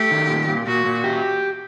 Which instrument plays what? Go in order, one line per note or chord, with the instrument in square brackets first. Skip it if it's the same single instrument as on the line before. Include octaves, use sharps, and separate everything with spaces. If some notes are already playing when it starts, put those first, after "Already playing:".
Already playing: [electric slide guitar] A3 [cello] G4
[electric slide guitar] D#3
A#2
A#2
[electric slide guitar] A#2 [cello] F#4
[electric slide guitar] A#2
G4